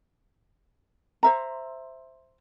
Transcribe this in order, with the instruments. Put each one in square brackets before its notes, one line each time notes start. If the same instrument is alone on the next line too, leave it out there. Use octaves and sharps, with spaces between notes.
[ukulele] C5 E5 A#5